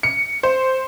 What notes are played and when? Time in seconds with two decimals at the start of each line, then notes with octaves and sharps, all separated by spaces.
0.03 C#7
0.43 C5